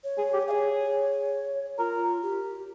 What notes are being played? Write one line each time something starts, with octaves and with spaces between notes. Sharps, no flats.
C#5
G#4
G4
G#4 C#5 F5
F4 A#4
G4